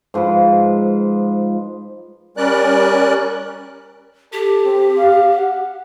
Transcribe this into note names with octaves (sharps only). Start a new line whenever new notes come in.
G#2 F3 F4 B4
G3 C#4 A#4 D5 F#6
G4 A4
C4
F5
F#5